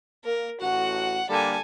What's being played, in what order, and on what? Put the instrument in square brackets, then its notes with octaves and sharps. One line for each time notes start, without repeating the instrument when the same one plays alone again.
[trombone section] A#3 [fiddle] A#4
[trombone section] A1 A2 F#4 [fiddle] F#5
[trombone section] D3 G3 A#3 [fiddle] A4 G#5